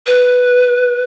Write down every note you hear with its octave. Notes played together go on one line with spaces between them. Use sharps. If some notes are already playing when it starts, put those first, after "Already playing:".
B4